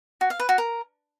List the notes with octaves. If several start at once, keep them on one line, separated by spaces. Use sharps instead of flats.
F#4
F5
B4
F#4
A#4